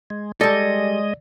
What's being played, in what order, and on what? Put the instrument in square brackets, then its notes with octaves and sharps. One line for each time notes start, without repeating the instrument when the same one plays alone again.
[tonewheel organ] G#3
[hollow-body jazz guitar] G3 A4 [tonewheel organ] G#3 D#5 [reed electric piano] D5